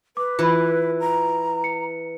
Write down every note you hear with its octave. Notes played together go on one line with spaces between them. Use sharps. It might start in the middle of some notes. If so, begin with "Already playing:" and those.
B4 D6
E3 F4 B5
A#5
C#7